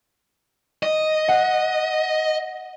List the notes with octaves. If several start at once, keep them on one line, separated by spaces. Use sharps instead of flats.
D#5
F#5